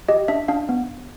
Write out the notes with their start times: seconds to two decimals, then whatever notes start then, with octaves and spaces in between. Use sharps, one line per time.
0.09 G4 D#5
0.28 D4 E5
0.48 D4 F5
0.69 B3